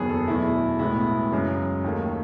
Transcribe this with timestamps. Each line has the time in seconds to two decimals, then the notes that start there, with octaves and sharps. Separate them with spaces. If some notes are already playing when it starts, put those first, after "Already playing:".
Already playing: F#1 E2 D#3 F#3 B3 G#4
0.09 A4
0.27 E2 B2 F#3 A3 E4
0.79 B1 A2 G#3 B3 E4
1.32 F#2 C#3 G#3
1.84 D#2 D#3 A3